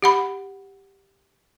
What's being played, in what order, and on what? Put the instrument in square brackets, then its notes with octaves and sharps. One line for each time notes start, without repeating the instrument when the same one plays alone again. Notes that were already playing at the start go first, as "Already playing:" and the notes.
[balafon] G4 F#5 B5